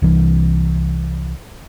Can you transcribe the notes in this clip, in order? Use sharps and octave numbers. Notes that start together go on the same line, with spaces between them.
C2 E3